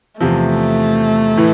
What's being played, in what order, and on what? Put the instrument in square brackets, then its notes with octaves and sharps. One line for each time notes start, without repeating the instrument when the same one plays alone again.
[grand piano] E2 C3 F3 [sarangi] A3
[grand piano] A2 E3